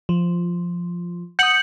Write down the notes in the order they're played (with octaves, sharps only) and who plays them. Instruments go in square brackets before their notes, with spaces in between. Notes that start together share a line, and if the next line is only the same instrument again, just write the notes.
[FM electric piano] F3
[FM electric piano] F#5 D#6 [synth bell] G6 C#7 F#7